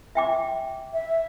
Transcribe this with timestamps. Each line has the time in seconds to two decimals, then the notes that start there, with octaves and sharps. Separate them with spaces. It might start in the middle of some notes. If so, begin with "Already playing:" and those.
0.15 E5 G5 D6
0.93 E5